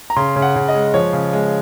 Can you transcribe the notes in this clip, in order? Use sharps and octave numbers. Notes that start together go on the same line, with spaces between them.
A#5
C#3 C6
C#3
F#5
C#3
D#5
G#3
F3 C#5
C#3
G#3